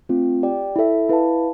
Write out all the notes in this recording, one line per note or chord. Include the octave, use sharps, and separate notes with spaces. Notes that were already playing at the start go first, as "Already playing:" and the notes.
A3 C4 F4
G4 D5 G5
E4 A4 E5
E4 B4 F5 A5